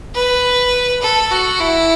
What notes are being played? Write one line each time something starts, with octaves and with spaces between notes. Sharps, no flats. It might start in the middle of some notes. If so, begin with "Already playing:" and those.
B4
A4
F#4
E4